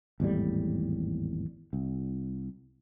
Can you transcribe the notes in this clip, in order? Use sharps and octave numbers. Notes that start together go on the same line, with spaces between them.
G#1 E2 A2 G3
C2